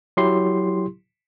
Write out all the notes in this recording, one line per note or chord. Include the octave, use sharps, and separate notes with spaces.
F#3 E4 G4 C6 C7